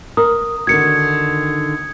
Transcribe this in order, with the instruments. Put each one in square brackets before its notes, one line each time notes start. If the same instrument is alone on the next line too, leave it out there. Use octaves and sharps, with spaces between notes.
[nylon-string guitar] A#4 [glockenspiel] D#6
[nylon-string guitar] D3 D#3 F#4 [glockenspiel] G#6 C#7